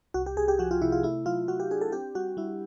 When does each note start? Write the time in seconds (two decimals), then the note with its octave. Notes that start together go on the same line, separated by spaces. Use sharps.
0.14 C2 F#4
0.26 G4
0.37 C2 G#4
0.48 G4
0.59 F3 F#4
0.71 F4
0.81 C3 E4
0.92 F4
1.03 A3 E4
1.26 F#3 F4
1.48 F#3 F#4
1.60 G4
1.71 D4 G#4
1.81 A4
1.92 C4 G4
2.15 G3 F#4
2.37 G3 E4